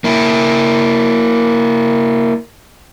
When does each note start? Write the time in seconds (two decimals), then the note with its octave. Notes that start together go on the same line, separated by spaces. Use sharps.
0.04 A#3 E4